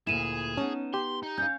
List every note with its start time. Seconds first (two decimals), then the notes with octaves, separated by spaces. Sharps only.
0.07 D2 A#2 E4 G#4 D#7 E7
0.57 B3 C#4 D#4 A5
0.94 G4 C6
1.23 D#4
1.38 C#4 F5 G6